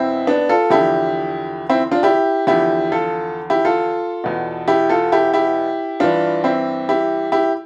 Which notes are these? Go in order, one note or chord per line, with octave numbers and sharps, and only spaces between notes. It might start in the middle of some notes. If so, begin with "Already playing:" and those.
Already playing: E2 B2 C4 E4
B3 D4
F4 A4
E2 D3 F3 E4 G4
C4 E4
D4 F4
E4 G4
E2 D3 F3 E4 G4
F4 A4
E4 G4
F4 A4
E2 B2
E4 G4
F4 A4
E4 G4
E4 G4
G2 E3 D4 F4
C4 E4
E4 G4
E4 G4